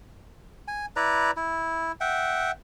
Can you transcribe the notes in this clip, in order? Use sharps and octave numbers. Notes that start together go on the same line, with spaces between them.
G#5
E4 B4 D5 A#5
E4
E5 F#5 G5